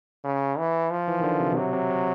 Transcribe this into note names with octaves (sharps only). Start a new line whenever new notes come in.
C#3
E3
F3
E3
D#3
D3
C3
B2
C3 F#3
C3
C3